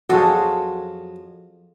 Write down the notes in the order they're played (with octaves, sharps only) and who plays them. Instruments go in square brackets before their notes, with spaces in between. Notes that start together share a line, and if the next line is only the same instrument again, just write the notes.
[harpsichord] F2 F#3 [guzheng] F4 A4 F5 [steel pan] F#4 G#4